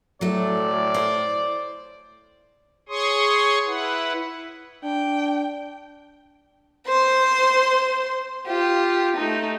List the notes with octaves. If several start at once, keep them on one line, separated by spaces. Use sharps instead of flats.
A2 F#3 A3 D5
C5
G#4 C#5 C6 C#6 D#6
E4 B4 F#5
D4 G5
C5 C6
F4 G4
A3 D#4